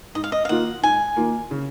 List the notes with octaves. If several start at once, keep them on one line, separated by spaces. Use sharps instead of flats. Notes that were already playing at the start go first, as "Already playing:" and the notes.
G#2 D#5
F5
D#5
F5
D#3 A#3 F4 F#5
G#2 G#5
D#3 A#3 F4
C#3